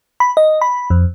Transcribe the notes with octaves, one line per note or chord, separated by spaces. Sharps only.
B5
D#5
B5
F2